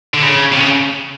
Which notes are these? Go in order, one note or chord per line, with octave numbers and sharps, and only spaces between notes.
D3
C#3
C3
C#3